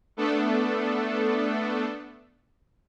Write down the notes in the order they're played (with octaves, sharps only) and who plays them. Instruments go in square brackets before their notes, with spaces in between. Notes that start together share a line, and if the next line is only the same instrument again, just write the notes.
[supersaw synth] A3 B3 D4 A4